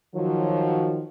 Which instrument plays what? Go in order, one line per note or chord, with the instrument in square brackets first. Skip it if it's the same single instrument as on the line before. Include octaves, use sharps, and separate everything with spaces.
[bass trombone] D#3 [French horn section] F3 F#3